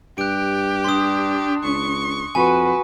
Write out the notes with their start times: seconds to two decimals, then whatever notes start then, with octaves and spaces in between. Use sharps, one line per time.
0.18 G2 G4 F#6 D7
0.84 D4 C6 D#6
1.64 C#2 C#6
2.35 F2 F#4 B4 G#5